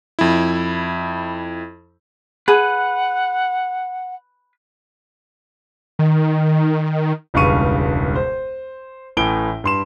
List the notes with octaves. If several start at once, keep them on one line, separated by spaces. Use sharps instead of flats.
F2 E4
G#4 B4 F#5
D#3
E1 C#2 G2 F5 C#6 D#7
C5
A1 A2 G#5 D7 G7
G2 C6 E7